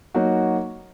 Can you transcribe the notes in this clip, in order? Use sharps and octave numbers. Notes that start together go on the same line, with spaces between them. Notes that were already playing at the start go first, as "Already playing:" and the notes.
F#3 A#3 D#4 F#4